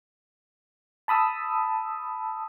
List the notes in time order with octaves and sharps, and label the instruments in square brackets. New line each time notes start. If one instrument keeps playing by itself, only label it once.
[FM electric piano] A5 B5 D#6 E6